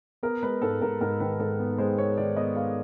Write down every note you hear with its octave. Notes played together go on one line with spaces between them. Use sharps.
B3 A#4
G#3 B4
G#2 A4
G#2 A#4
G#2 A#4
D#3 B4
G#2 A4
B3
G#3 C5
B3 C#5
D#3 D5
B3 D#5
B3 F5